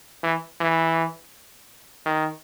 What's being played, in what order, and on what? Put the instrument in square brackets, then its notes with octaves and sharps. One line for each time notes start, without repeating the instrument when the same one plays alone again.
[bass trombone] E3
E3
D#3